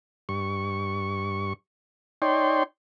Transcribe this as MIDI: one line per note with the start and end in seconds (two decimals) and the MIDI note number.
0.29 1.53 43
0.29 1.53 85
2.22 2.63 63
2.22 2.63 73
2.22 2.63 74
2.22 2.63 79
2.22 2.63 84